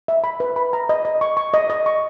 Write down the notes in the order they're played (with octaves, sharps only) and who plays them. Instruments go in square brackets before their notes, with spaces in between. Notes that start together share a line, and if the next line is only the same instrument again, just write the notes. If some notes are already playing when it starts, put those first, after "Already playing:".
[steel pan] E5
B5
B4
B5
A#5
D#5
D#5
C#6
C#6
D#5
D#5
C#6